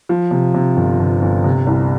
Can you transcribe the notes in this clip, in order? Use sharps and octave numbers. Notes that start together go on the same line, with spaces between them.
F3
C3
C3
G1
G1
G1
C3
C2